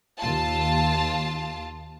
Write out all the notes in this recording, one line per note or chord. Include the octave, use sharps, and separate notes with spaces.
D#2 F4 A5